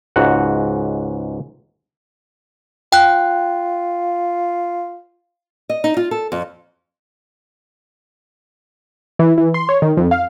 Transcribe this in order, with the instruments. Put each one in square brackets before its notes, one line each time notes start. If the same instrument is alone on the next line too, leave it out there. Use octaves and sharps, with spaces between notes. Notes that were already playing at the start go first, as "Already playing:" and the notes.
[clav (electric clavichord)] C#2 G#2 F#4 F#5
[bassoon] F4 [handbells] G5 F#6
[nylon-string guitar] D#5
D#4
F4
A4
F2
[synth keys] E3
E3
C6
C#5
D#3
F2
F5